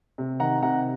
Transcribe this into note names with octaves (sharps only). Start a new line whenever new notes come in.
C3
D#3 F#5 A#5
C3 F#5 A#5